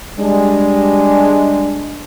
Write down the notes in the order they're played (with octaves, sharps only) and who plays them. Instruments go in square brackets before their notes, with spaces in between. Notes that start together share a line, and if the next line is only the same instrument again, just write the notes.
[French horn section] G3 G#3 D4